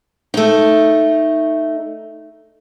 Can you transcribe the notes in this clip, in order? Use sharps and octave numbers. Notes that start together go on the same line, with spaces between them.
A3 D#4